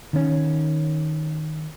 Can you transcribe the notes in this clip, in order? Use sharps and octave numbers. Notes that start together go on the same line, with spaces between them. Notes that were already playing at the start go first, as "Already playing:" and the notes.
D#3 C#4